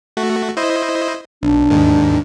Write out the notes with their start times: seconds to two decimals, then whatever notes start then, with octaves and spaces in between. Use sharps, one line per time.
0.17 A3 F#4
0.57 E4 C5 D#5
1.43 B1 D4
1.70 D#2 G#2 D#3